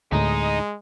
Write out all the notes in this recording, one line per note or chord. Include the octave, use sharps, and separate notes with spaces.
D2 A2 G#3 D#4